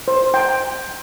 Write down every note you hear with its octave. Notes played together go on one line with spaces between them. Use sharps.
C5
G5 A#5